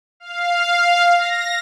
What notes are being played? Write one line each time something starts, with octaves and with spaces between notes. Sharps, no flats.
F5
A#6